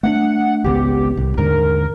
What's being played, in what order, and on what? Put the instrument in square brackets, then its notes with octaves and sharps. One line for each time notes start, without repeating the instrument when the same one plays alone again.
[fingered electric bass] A3 A#3 D4 [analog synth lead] F#5
[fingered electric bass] G#1 C#2 B3 [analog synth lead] G4
[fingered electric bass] C2
[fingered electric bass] D#2 G#2 D3 [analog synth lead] A#4